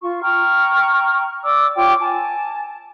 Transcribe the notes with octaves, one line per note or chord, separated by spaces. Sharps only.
F4 C#6
G5 A#5 C#6 F6
D5 D6 E6
F4 C#5 G5 D6
G#5 A5